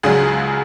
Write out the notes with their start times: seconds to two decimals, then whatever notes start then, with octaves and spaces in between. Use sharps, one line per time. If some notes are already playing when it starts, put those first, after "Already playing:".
0.03 C#2 C#3 F#3 G#4